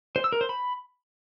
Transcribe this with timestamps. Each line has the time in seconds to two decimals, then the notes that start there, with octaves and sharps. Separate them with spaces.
0.16 C5
0.24 E6
0.32 A#4
0.41 C5
0.49 B5